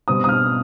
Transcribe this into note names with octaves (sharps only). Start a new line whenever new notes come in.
B2 G3 C4 D#6
D#6
F6